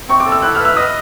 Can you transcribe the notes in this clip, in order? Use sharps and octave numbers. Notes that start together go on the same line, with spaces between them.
C4 C#6
D6
A4
E6
E4 F#6
F6
B4
E6
D#5 D#6